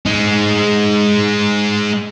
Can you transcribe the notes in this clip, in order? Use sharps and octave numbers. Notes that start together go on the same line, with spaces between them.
G#3 D#4